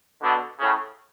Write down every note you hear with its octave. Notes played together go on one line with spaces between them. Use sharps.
B2 D3
A2 C#3